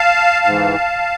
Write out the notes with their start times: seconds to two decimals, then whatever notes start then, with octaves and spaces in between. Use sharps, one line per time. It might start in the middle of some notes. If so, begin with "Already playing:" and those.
Already playing: F5 A5
0.45 G#2 E3